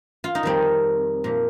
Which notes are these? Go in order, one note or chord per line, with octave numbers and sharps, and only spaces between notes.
F4
D#4
F2 D#3 G3 C4
A#2 F3